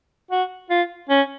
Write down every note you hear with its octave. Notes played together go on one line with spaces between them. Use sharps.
F#4
F4
C#4